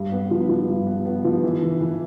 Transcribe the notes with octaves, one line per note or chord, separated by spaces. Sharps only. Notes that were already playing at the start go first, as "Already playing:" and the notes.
Already playing: G2
B3
F3
F3
G2
B3
B3
F3
E3
E3
E3